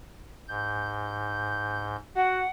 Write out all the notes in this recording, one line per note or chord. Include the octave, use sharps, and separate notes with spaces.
G#2 G6
F#4 F#5